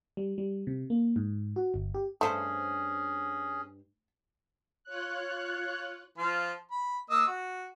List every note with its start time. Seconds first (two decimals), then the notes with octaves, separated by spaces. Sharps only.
0.17 G3
0.38 G3
0.67 C3
0.90 A#3
1.16 G#2
1.56 F#4
1.74 G1
1.95 G4
2.21 G2 A3 C#4 G#4 C5
4.84 F4 C#5 F#6
6.18 F3 F4
6.71 B5
7.10 A#3 D#5 E6
7.27 F#4